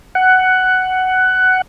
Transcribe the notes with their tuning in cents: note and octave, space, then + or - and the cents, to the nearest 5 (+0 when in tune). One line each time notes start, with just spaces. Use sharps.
F#5 +10